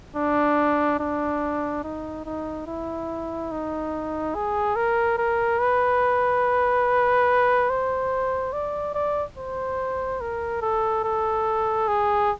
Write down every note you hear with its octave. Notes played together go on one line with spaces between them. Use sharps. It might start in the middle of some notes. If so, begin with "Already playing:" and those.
D4
D4
D#4
D#4
E4
D#4
G#4
A#4
A#4
B4
C5
D5
D5
C5
A#4
A4
A4
G#4